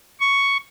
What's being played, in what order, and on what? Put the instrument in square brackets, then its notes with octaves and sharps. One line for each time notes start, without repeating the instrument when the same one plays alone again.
[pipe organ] C#6